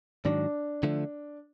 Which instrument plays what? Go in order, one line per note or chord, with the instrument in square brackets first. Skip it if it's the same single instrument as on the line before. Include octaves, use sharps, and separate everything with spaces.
[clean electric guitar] G#2 D#3 F#3 [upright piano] D4
[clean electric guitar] D3 F3 A3